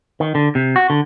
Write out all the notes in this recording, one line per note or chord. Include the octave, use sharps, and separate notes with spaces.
D#3
D3
C3
F#4
D3